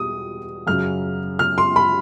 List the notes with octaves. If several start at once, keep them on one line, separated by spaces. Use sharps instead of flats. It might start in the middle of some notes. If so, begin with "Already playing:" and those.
Already playing: E2 B2 G3 D#6
F#2 C#3 F#3 F6
F6
C6
B5